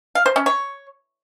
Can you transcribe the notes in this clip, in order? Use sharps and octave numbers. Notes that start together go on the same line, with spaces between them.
F5
C5
C#4
C#5